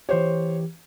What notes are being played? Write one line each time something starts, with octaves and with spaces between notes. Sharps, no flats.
E3 G4 C5 C#5